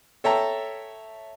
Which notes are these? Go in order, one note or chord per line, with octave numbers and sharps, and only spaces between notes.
A4 C#5 E5 G5 A5 A#5